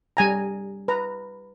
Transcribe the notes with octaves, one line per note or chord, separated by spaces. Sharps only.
G3 G#5 A#5
B4 A#5